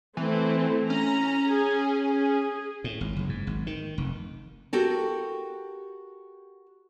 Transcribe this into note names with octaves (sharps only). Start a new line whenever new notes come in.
E3 A3 C4 E4
C#4 A#5
G#4
G#4
A2
G#1
F#1
G#2
G#1
D#3
F1
F#4 G4 A4 A#4